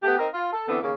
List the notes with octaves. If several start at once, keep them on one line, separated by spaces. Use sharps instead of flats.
A3 B3 G4
C4 D#4 A#4
F4
A4
D3 E3 B3 C4 A4
D#2 C#3 A#3